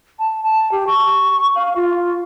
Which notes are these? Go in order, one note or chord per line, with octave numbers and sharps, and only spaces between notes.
A5
A5
G4
C#6
F5
F4